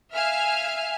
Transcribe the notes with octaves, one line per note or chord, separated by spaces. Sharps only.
E5 F5 G#5 F6